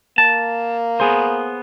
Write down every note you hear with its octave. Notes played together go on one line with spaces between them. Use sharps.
A#3 A5
B3 G#4 C5